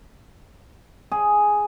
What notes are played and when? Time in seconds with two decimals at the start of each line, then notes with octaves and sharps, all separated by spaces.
1.12 G#4